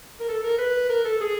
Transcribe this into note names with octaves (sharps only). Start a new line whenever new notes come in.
A#4
A4
A#4
B4
A#4
A4
G#4